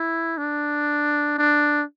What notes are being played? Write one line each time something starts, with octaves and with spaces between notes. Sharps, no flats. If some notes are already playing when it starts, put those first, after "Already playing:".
Already playing: E4
D4
D4